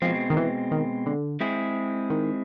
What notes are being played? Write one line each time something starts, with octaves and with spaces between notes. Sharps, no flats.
B2 F3 G#3 C4
D#3
E3
D#3
D3
G#3 C4 E4 G#4
D#3